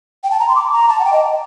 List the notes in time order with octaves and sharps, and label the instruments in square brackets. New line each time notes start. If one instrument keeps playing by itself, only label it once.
[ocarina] G5
A5
A#5
C6
D6
A#5
A5
F#5
G5
D#5